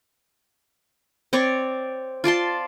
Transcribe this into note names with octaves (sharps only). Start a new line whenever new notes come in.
C4 C#5 D5
F4 D5 A5 C6